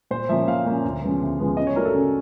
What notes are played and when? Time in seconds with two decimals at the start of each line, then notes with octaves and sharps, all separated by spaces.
0.11 A#2 C5
0.29 F3 A#3 C#4 E5
0.48 A#2 F5
0.65 F3 A#3 C#4
0.85 D2
1.02 C#3 F3 G#3 B3
1.21 D2
1.39 C#3 F3 G#3 B3
1.57 C#3 D#5
1.67 C#5
1.75 F#3 A3 D4 A#4
1.85 A4
1.94 C#3